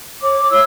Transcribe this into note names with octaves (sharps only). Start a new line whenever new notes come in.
C#5 D6
E4 E6